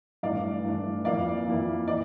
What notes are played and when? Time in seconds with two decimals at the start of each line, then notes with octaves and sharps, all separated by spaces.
0.23 G2 E3 A3 D4 D5 F5
0.64 G2 E3 A3 D4
1.05 F2 E3 A#3 E4 D5 F5
1.46 F2 E3 A#3 E4
1.87 E3 D5